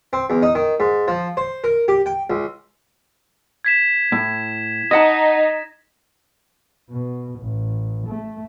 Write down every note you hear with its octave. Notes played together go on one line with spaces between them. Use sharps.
C4
E2
D#4
D#3
G#2
F3
C5
A#4
G4
G5
C#2
G#6 B6 E7
A2
D#4 D#5 F#5 A5 A#6
B2
A1
A3